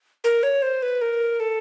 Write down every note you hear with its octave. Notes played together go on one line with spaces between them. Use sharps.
A#4
C#5
C5
B4
A#4
A4